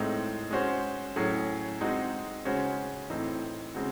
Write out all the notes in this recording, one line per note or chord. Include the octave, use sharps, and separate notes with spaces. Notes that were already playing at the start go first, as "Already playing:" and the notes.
Already playing: A2 G#3 C4 D#4
G#3 C#4 F#4 C5
A2 F#3 C#4 G#4
G#3 C4 D#4 F#4
C#3 G#3 C#4 F#4 C5
A2 E3 C4 D#4
C#3 G#3 C4 F#4